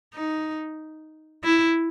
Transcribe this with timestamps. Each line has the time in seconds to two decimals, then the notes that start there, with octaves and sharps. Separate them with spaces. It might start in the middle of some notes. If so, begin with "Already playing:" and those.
0.14 D#4
1.44 E4